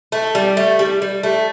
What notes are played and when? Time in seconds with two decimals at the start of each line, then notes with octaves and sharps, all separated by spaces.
0.12 A3
0.35 G3
0.57 A3
0.79 G3
1.02 G3
1.23 A3